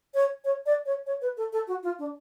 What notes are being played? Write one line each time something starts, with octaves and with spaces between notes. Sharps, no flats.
C#5
C#5
D5
C#5
C#5
B4
A4
A4
F#4
F4
D4